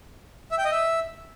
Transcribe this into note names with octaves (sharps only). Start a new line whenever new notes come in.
E5
G5
D#5
E5